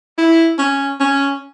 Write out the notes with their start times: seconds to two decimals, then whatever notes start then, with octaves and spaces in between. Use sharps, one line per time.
0.18 E4
0.58 C#4
1.00 C#4